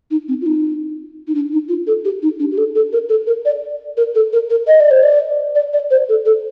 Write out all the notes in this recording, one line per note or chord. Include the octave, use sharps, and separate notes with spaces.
D#4
C4
F4
D#4
D#4
D4
D#4
F4
A4
G4
D#4
D4
G4
A4
A4
A#4
A4
A#4
D5
A#4
A4
A#4
A#4
D#5
D5
C5
D5
D5
D5
C5
A4
A4